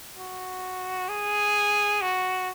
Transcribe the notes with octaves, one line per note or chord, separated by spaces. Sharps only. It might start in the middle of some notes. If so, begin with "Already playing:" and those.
F#4
G#4
F#4